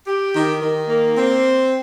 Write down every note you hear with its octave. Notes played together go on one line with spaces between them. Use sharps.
G4
D#3
D#3
A#3
C4